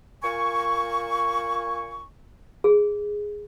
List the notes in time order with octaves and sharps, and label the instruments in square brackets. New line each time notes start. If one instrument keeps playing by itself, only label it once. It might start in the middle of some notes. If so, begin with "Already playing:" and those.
[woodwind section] A#2 G#5 C#6
[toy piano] G#4